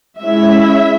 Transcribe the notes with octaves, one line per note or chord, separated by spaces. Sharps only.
G#3 C#4 E4 E5